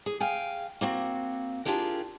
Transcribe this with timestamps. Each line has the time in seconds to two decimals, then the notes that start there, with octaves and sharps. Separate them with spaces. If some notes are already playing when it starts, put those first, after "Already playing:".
0.06 G#4
0.20 F5 G5 G#5
0.81 A#3 C4 F#4
1.65 D4 F4 G4 G#4 A#4